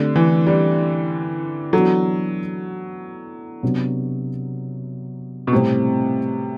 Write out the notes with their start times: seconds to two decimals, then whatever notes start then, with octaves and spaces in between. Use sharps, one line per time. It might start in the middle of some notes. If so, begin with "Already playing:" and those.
Already playing: D3 A3 C4 G4 D5
0.16 E3
0.47 G3
1.73 E3 F#3 B3 D4 F#4 A4
3.63 C3 F#3 B3 D4
5.47 B2
5.52 A2 C3 G3 C4 G4 C5